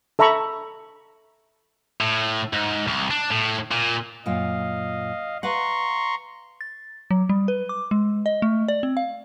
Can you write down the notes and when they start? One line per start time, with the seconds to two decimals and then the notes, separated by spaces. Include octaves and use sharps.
0.19 A4 E5 A#5 B5 C#6
2.01 A2
2.53 G#2
2.88 C2
3.11 D4
3.31 A2
3.72 A#2
4.26 F#2 A#2 F4 D#5 F5
5.43 B4 F5 F#5 A#5 C6 C#6
6.61 A6
7.11 F#3
7.29 G3
7.48 B4
7.69 D6
7.91 G#3
8.26 D#5
8.42 A3
8.68 D5
8.83 C4
8.97 F5